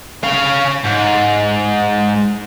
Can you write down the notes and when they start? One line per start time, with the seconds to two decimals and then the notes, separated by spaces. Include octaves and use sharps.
0.23 C#4 F5
0.84 G#2